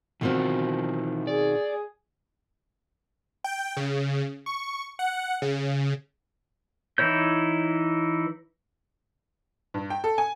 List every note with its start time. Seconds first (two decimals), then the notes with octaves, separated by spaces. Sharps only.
0.21 B2 D#3 E3 C4 F4 F#4
1.27 G#4 D5
3.44 G5
3.77 C#3
4.46 C#6
4.99 F#5
5.42 C#3
6.98 E3 D#4 E4 C#5 G6
9.74 G2
9.90 G5
10.04 A4
10.18 G#5